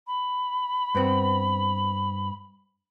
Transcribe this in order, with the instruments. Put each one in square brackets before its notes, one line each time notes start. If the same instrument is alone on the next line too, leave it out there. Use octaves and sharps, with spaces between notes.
[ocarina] B5
[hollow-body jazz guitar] G2 B3 C4